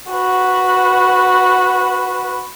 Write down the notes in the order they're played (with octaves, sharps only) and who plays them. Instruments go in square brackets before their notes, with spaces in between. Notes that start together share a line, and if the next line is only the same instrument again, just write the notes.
[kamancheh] F#4 B4